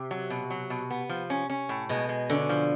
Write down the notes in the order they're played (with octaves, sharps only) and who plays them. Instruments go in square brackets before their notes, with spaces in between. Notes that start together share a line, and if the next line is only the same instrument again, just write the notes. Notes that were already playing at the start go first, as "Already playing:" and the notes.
Already playing: [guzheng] C3
[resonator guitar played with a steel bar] F#3
B2
F#3
B2
B3
F3
C#4
C#4
A2
[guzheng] B2 [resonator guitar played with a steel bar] G#3
[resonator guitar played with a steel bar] G#3
[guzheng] D3 [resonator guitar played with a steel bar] C#4
[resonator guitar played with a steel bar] F3